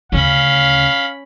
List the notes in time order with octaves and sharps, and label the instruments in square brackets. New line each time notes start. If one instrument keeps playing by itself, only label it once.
[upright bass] D2 C#3 [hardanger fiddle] C#4 B5 [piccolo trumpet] F5